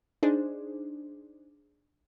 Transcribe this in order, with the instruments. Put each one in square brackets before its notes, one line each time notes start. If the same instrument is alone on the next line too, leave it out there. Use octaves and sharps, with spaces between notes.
[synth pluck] D4 D#4 G#4 C5